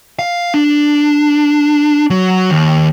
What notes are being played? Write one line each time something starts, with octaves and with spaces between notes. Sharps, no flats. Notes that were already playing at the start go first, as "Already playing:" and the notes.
F5
D4
F#3
D#2